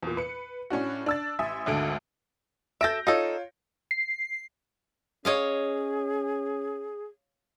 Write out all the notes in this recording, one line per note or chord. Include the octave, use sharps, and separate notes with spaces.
E2 A#2
B4 C#7
A2 C#4 D4 F#4
D4 E6 A6
A1 E5 G#5 D#6
G#1 D2 D3 A4 D7
A4 E5 G6 A#6 D7
D#4 F4 A4 C#5
C7
C#4 G#4 C#5 D#5 F5